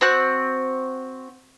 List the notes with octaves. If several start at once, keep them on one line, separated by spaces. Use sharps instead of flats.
C4 F#4 F#6